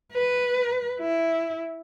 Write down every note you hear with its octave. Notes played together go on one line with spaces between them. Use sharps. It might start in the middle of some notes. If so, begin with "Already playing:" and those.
B4
E4